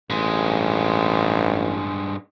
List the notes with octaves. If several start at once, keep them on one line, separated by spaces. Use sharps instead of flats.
A1 G2 G#3